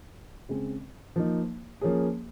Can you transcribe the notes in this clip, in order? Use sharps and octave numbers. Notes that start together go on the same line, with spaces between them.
C#3 G#3 C4
F3 A#3 D#4
F3 A#3 C#4 G#4